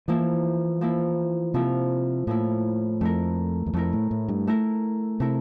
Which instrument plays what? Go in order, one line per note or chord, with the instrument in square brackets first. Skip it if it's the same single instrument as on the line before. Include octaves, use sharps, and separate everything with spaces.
[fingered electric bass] E3 [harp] F3 A#3 E4
[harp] F3 A#3 E4
[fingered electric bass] C3 [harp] F3 A#3 E4
[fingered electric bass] A2 [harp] F3 A#3 E4
[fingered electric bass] F2 [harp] A3 E4 A#4
[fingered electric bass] E2
[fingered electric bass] F2 [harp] A3 E4 A#4
[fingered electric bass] A2
A2
G2
[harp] A3 E4 A#4
[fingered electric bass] C3 [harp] A3 E4 A#4